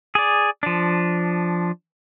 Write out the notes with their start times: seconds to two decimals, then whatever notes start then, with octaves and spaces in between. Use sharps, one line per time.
0.15 G#4 D5
0.63 F3 D4